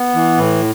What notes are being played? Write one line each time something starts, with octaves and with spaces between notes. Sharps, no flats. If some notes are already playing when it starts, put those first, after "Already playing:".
Already playing: B3
E3
A2